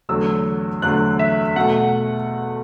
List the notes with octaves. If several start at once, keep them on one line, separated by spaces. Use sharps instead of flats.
E2 D3 F#3 A3 E6
E2 D3 F#3 A3 F#6
E5
B2 A3 F#5